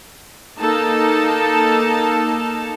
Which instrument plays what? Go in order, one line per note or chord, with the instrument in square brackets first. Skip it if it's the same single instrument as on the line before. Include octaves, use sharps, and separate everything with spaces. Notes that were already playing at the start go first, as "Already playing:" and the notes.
[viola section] A#3 D#4 A4 A5